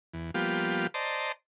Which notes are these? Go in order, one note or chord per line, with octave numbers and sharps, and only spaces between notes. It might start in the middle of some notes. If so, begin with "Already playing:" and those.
E2
F3 G3 A#3 B3 F4 G4
C5 D5 D#5 A5 A#5 C6